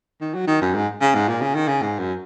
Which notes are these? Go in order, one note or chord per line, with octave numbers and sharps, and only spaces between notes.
D#3
F#3
D#3
F#2
G#2
C#3
G#2
A#2
C#3
D#3
C#3
G#2
F#2